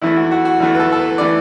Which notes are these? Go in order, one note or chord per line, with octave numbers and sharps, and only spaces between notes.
E2 E3 A3 E4
F#4
F#4
F#4
E2 E3 A3
B4
A4
A4
B4
E3 A3 D5